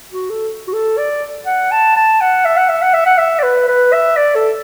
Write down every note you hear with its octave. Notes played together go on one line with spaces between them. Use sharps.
F#4
A4
F#4
A4
D5
F#5
A5
A5
F#5
E5
F#5
E5
F#5
E5
F#5
E5
D5
B4
B4
E5
D5
A4